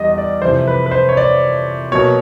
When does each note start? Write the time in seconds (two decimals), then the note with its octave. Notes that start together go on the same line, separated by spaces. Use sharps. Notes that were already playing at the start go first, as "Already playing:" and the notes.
Already playing: E2 G3 D#5
0.10 D#5
0.18 D5
0.42 F2 C3 E3 C5
0.67 B4
0.86 B4
0.91 C5
1.09 C#5
1.17 D5
1.91 B2 F#3 A#3 C#5